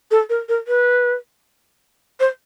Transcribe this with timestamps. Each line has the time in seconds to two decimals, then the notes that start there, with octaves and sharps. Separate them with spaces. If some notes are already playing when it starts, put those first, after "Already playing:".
0.11 A4
0.29 A#4
0.49 A#4
0.68 B4
2.20 C5